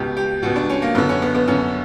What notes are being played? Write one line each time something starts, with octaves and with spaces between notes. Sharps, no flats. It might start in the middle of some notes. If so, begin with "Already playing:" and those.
Already playing: C#2 B2 G4
G4
C#2 B2 F#4
D4
C#4
A#3
F#2 D3 B3
C#4
B3
B3
F#2 D3 C#4